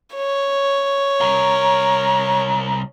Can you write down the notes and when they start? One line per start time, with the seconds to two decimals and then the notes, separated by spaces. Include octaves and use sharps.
0.16 C#5
1.21 C2 A#4